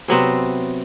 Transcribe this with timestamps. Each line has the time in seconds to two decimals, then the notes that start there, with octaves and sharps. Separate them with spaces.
0.08 C3 F#3 B3 C4